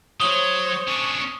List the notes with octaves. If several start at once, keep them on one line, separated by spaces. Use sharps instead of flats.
F#3 C5 C#5 D#6 G7
C#4 D4 C#6